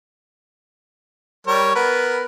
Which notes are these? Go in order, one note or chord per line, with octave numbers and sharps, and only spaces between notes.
G3 A#4 C#5
B3 A#4 B4